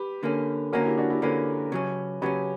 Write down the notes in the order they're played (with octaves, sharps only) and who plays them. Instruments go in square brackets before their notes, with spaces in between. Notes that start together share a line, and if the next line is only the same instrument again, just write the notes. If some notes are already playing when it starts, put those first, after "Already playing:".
Already playing: [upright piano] G4 B4
[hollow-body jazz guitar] D3 A#3 C#4
[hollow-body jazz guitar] D3 A#3 C#4 [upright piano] F#4 A#4
[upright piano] E4 G4
D4 F#4
E4 G4
[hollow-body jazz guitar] D3 A#3 C#4 [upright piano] G4 B4
[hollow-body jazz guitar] C#3 F#3 C#4
[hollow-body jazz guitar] C#3 F#3 C#4 [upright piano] G4 B4